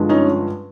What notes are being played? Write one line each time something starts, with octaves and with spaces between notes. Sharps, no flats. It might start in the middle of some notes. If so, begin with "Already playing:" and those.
Already playing: G2 D3 F3 G#3
C#4 D#4